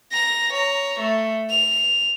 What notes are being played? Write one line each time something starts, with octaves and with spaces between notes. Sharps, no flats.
A#5 A#6
C#5 A#5
A3
F7